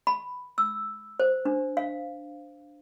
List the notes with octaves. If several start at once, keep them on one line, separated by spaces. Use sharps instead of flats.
B5
E6
C5
D4
F5